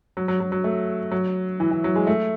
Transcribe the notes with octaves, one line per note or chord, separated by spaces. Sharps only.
F#3
F#3
F#3
F#3
A3
F#3
E3
E3
F#3
G#3
A3